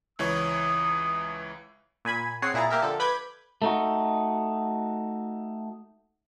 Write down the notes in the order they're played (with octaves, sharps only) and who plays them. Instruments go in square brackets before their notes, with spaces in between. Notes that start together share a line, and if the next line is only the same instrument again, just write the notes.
[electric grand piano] C#2 E3 C#5 [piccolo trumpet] D#6
[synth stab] A#2 G#5 B5 G#6
C4 G#4 C#5 F#5 C7
A#2 E4 G#4 A#5 A6
A#3 G4 A#4 E5
D3 F3 A4
B4 B5 D6 G6 G#6
[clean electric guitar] A3 D#4 F#4